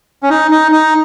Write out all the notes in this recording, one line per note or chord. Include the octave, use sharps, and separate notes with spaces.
C#4
D#4
D#4
D#4